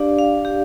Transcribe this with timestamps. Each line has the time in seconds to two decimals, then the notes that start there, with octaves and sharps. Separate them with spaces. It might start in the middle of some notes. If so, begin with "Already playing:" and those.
Already playing: D4 G4 D5 F5
0.19 F5
0.45 G4